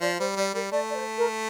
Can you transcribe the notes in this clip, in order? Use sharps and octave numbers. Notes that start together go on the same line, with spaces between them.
F3 D5
G3 C5
G3 D5
G3 A#4
A3 D5
D5
C5
A#4